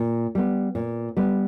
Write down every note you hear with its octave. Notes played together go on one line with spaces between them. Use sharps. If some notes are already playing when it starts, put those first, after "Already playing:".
Already playing: A#2
G3 B3
A#2
G3 B3